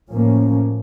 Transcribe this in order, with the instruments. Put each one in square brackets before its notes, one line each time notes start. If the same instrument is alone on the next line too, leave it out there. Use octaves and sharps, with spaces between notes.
[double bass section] A2 F3 A#3 C#4